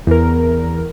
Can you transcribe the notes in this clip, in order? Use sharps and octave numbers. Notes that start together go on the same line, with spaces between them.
E2 A#4